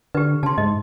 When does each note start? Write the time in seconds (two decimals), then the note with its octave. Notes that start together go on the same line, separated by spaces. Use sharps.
0.15 D3 G4 B4
0.43 C#3 A5 C6
0.58 G#2 D#5